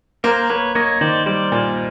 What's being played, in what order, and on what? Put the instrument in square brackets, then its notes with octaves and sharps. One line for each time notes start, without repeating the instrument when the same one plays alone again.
[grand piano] A#3 [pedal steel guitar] A#4 C5
[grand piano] A#3 [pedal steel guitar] B4 C#5
[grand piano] A#3 [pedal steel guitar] C#5 D#5
[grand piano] D#3 [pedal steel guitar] C5 D5
[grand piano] G3 [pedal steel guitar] C5 D5
[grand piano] A#2